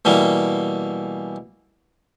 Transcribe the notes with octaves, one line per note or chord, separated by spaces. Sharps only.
B2 E3 G3 A#3